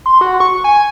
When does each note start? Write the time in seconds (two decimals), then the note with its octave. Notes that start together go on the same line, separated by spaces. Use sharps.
0.06 C6
0.21 F#4
0.40 C#6
0.64 G#5